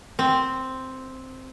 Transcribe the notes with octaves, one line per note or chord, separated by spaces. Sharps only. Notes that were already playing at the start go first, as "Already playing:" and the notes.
C4